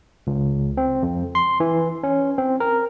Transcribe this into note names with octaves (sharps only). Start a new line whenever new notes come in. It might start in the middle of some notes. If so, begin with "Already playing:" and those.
C#2
C4
F2
C6
E3
C#4
C4
A#4